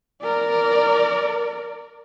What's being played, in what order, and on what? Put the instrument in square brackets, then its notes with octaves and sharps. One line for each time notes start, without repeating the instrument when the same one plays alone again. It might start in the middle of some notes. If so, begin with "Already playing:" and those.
[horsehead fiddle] A#4 D5